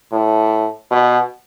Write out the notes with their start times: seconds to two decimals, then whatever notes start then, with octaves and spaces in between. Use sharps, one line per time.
0.12 A2
0.91 B2